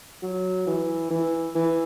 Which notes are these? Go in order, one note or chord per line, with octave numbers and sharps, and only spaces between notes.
F#3
E3
E3
E3